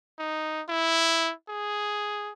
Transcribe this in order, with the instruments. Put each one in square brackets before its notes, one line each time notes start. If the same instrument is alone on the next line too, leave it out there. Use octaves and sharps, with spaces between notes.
[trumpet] D#4
E4
G#4